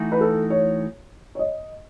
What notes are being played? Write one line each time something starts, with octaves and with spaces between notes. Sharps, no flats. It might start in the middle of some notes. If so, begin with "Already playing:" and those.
Already playing: E3 A3 D#4 F#4
B4
A4
C#5
C#5
D#5